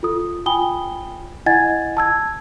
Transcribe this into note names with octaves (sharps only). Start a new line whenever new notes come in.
F4 A4 D#6
F4 G5 G#5 B5 D#6 G7
E4 D#5 F#5 G#5 G#6 A6
A5 E6 G#6